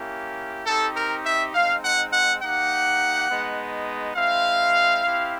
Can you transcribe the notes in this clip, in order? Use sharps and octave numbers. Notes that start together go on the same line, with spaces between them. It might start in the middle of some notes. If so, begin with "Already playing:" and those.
Already playing: A#3 C#4 E4 G4
C4 D#4 G4 A4
A#4
E5
G#3 C4 D#4 F5
F#5
F#5
A#3 D#4 G4 F#5
G#3 B3 D#4
G#3 C4 E4 F5
C4 E4 G4